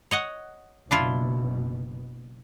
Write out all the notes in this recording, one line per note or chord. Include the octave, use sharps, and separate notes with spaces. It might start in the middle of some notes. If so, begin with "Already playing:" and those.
C#5 D#5 F#5
F#1 B2 D4 E4 F4